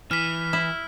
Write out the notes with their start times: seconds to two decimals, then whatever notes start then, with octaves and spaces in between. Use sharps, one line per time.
0.11 E3 F6 B6
0.53 E4